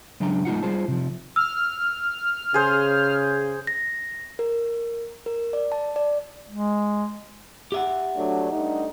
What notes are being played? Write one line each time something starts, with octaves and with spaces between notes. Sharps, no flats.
C#2 C#3 F#3 D4 G5 A#5
G#3 D#4 F4 F#5
G3 F4 G#4 C5 A5
C3 F3
E6 F6
C#3 G#4 C5
A#6
A#4
A#4
D5
A5
D5
G#3
G4 E5 F#5
F#3 A3 D4
G2 A3 D#4